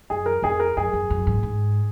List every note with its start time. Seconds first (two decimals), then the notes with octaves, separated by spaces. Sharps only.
0.10 F#2 G#4
0.26 A#4
0.42 F2 G#4
0.60 A#4
0.77 F#2 G#4
0.93 F#2
1.10 F#2
1.27 G#2
1.43 G#2